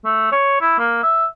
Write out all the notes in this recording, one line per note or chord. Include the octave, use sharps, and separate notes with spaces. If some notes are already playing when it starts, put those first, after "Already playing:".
A3
C#5
E4
A#3
E5